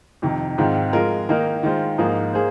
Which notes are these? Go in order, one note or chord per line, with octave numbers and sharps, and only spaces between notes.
F2 C3 D#3
G#2 D#3 C4 F4
F3 G#3 F4 A#4
D#3 A#3 D#4 A#4
D#3 G#3 F4 C5
G#2 F3 A#3 D#4 G#4
A#3 G#4 C5